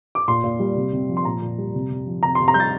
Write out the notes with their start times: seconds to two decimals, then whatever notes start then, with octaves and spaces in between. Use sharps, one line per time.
0.15 D6
0.28 A#2 C6
0.44 A#2
0.60 G3
0.76 C3
0.93 C3
1.09 F3
1.17 C6
1.25 A#2 A#5
1.42 A#2
1.58 G3
1.74 C3
1.90 C3
2.06 F3
2.23 C3 A#5
2.35 C6
2.40 C3
2.48 A#5
2.54 G3 G6
2.60 A6